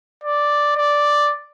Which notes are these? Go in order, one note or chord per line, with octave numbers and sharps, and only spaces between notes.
D5
D5